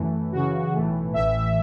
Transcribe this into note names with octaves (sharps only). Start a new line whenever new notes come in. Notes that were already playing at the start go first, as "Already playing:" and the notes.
Already playing: F#2 E3 A3
F#2 C#3 E3 F#4
B1 A2 E3 A3
A1 A2 E3 E5